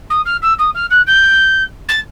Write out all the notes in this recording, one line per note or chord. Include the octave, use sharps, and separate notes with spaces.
D#6
F6
E6
D#6
F6
F#6
G6
A6